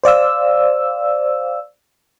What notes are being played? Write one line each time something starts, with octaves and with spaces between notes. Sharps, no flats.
C5 D5 F5 E6